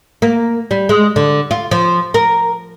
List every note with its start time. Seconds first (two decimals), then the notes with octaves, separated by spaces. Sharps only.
0.22 A#3
0.71 G3
0.89 G#3
1.16 D3
1.51 F4
1.71 F3
2.14 A#4